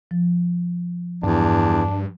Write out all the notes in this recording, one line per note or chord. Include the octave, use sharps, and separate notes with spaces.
F3
E2 G2 D4